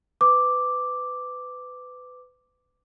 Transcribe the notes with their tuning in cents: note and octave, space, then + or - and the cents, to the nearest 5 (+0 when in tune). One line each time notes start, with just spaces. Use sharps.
B4 +25 D6 +0